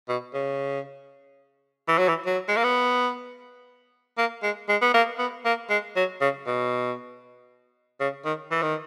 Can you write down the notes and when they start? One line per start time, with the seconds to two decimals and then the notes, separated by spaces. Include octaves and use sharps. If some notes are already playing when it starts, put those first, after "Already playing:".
0.09 B2
0.34 C#3
1.88 E3
1.98 F#3
2.08 E3
2.26 F#3
2.48 G#3
2.56 A#3
2.64 B3
4.18 A#3
4.43 G#3
4.69 G#3
4.82 B3
4.94 A#3
5.18 B3
5.45 A#3
5.70 G#3
5.96 F#3
6.21 C#3
6.46 B2
8.00 C#3
8.25 D#3
8.51 E3
8.62 D#3